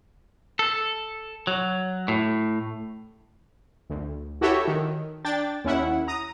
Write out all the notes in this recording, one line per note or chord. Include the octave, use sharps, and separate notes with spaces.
A4
F#3
A2
D2
E4 F#4 G4 A4 C#5 E5
D#3
D4 G5 A6
D#2 C#4 E4 F#5
A#5 D#6